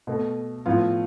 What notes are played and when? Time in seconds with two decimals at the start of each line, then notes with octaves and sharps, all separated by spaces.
0.07 B2 A3
0.66 A2 F3 B3 F4